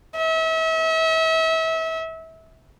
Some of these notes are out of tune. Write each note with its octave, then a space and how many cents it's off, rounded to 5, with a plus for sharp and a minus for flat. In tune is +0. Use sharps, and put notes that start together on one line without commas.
E5 -35